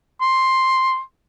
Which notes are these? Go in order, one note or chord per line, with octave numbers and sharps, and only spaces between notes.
C6